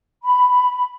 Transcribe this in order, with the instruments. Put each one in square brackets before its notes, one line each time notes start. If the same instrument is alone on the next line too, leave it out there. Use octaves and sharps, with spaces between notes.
[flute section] B5